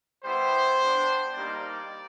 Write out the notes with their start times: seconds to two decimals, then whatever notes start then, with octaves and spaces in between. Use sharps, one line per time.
0.23 G3 B3 E4 G4 C5
0.79 B3 D4 G4
1.35 G3 A#3 D#4 G4 D5